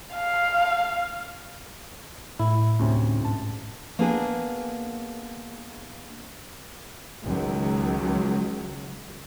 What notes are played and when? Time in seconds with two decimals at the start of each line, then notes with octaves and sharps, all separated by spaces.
0.14 F5
2.39 A2 E4
2.80 D2 A2 C3 C#4
3.21 G#2 A5
3.99 A#3 B3 D4 G#4 B4 G#5
7.23 C#2 D#3 F#3